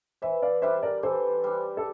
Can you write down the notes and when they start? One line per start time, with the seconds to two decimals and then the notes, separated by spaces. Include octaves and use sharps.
0.22 E3 C5 E5
0.42 D5 F5
0.62 G3 D4 C5 E5
0.83 A#4 D5
1.03 E3 A4 C5
1.44 G3 D4
1.77 A4